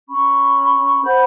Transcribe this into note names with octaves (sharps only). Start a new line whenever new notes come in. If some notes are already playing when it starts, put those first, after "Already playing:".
C#4 B5 C#6
C5 F#5 B5 G6